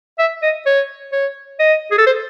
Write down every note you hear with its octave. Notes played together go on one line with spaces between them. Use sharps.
E5
D#5
C#5
C#5
D#5
G#4
A4
C5